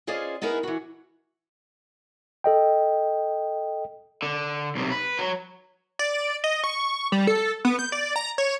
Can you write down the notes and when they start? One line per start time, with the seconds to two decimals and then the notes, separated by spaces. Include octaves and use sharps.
0.07 C#4 F4 G#4 C5 D5 D#5
0.42 B3 D#4 E4 G#4 A#4 B4
0.63 E3 F#4
2.44 A4 D#5 G5
4.23 D3
4.76 B1 C3
4.92 B4
5.19 F#3
5.99 D5
6.44 D#5
6.64 C#6
7.12 G3
7.27 A4
7.65 B3
7.79 G6
7.92 D5
8.16 A#5
8.38 C#5